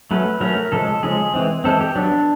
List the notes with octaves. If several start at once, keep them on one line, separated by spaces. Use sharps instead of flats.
F#3 A3 C#4 B4
F#3 A3 C#4 A#4
C#3 F3 G#3 A4
C#3 F3 G#3 G#4
E3 G#3 C4
E3 G#3 C4 A4
G4
F#3 B3 D4